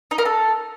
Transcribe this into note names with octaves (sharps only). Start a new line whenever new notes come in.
D#4
A#4
A4